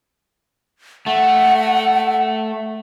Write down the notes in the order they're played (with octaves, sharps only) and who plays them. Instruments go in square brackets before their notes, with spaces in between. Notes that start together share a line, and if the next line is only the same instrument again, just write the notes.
[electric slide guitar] A3 [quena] F#5